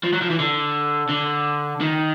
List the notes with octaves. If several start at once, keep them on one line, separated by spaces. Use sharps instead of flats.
F3
F#3
F3
E3
D3
D3
D#3